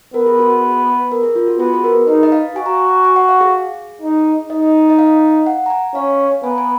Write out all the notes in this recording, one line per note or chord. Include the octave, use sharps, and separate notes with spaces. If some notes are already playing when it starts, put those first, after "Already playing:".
B3 A#4
G#4
F#4
A#4
G#4
F4
F#4
B3 G#4
F#4
G#4
A#4
D#4 B4
D#5
F5
F#4 G#5
A#5
G#5
G#5
F#5
F5
G#4
D#4
D#4 D#5
D#5
F5
F#5
A#5
G#5
C#4 F5
B3 G#5
A#5
G#5